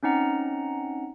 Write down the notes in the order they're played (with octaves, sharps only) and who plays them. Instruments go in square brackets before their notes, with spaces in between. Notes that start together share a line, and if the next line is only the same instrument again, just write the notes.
[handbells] C4 C#4 D#4 F#5 A#5